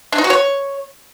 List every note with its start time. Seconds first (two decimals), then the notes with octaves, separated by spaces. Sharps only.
0.12 D4
0.18 D#4
0.24 F#4
0.30 C#5